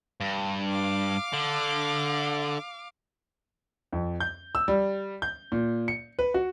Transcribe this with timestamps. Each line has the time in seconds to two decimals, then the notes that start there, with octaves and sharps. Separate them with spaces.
0.21 G2
0.69 F5 D6
1.33 D3
3.93 F2
4.20 G6
4.55 E6
4.68 G3
5.22 G6
5.52 A#2
5.88 C#7
6.19 B4
6.34 F#4